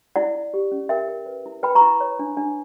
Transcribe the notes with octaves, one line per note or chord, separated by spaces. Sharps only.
E4 D5 F#5
E4
G4
C#4
A#4 E5 G5
A#4
B4
E4
B4 G5 B5
A#5 C#6
E4
C#5
D4
D4